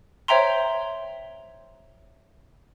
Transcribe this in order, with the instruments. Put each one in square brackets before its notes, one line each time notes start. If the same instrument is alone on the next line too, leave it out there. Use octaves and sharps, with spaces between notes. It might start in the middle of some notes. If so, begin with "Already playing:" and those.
[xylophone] C5 C#5 E5 G5 A#5 C6